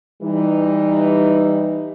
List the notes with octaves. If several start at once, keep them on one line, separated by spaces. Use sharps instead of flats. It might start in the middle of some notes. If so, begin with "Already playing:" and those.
E3 G3 D#4